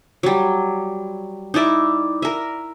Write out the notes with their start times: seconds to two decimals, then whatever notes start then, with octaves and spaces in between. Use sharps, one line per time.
0.23 F#3 G3
1.54 D#4 E4 D5 E5
2.22 A#4 E5